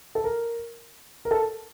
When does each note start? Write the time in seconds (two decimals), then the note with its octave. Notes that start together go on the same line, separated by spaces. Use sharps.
0.15 A4
0.24 A#4
1.25 A#4
1.31 A4